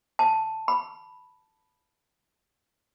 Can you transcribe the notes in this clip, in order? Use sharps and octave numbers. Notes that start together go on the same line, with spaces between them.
A5
B5